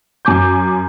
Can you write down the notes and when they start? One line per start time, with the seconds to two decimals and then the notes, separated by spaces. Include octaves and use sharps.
0.25 F#2 G#5 D6 G6